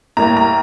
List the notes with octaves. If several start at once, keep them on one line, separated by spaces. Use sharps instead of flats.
A2 G3 A#3 A#5
A#5